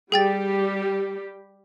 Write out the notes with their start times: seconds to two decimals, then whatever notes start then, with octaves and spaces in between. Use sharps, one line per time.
0.12 G3 G4 G#4 G5 A6